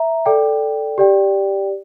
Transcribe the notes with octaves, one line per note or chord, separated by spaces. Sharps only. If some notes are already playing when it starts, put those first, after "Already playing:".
Already playing: E5 A#5
A4 D5 G5
G4 D5 G5